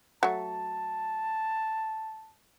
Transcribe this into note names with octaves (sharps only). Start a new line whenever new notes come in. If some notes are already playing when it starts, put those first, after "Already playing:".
F#3 A3 A5